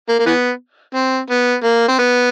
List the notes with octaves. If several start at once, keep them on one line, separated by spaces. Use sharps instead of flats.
A#3
A#3
E3 B3
C4
B3
A#3
C4
B3